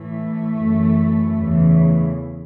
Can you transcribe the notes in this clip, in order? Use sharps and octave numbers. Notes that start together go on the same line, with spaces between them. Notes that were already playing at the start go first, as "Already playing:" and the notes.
Already playing: A2 E3 A3
F#2 E3
E2 C#3 E3